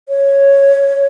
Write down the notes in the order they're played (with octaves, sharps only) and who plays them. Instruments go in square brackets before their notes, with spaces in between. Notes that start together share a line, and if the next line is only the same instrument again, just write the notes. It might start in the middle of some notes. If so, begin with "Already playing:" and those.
[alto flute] C#5